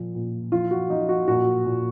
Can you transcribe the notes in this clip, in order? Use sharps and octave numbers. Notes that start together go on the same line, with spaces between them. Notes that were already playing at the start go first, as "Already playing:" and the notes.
Already playing: A#2 F3
A#2
F3 F4
F#4
F3 D#4
F#4
A#2 F#4
A#2